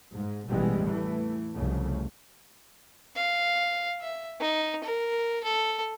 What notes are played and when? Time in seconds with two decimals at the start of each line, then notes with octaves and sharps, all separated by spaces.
0.14 G#2
0.49 A1 B2 E3 G3 G#3
0.84 E2 E3 A3
1.53 C2 F2 C#3 A3
3.16 F5
4.01 E5
4.40 D#4
4.84 A#4
5.44 A4